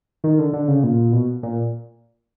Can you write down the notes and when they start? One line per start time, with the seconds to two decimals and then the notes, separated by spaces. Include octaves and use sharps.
0.24 D#3
0.39 D3
0.53 D3
0.68 C#3
0.84 A#2
1.12 B2
1.43 A#2